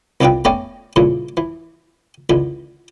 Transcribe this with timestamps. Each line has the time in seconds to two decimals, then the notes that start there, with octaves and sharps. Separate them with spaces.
0.21 C2 C3 D4 F4 B4 G5
0.45 A3 B3 C#4 C#5 D5 G5
0.96 G2 A#2 C#3 E3
1.37 E3
2.30 C#2 D3 E3